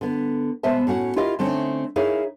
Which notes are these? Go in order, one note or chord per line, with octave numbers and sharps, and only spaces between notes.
D3 B3
B2 G#3 B3 C5 E5 A5
A2 C#4 F#4 F#5
E4 F4 G4 A#4 D#5 F5
D3 A3 C4 C#4 D#4
D#4 E4 G#4 A#4 C#5 F5